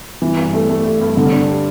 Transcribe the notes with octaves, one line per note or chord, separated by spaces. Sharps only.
E3
G2
A3
A3
A3
G2
D3
D4
G4